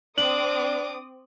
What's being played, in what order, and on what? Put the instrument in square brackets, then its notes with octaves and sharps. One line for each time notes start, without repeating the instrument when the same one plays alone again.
[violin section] C4 D6 D#6 [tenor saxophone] D4 [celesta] F#7